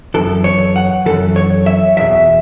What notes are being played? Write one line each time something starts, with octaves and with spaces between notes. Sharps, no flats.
F#2 E3 A4
C#5
F#5
F#2 E3 A4
C#5
E5
E2 B2 E5